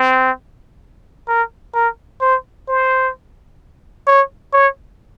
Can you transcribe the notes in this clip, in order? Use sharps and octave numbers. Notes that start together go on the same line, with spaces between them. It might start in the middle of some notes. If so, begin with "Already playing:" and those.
Already playing: C4
A#4
A#4
C5
C5
C#5
C#5